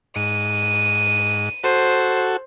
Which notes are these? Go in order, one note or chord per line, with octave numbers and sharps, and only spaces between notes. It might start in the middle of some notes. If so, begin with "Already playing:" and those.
G#2 D#7
F#4 A4 C5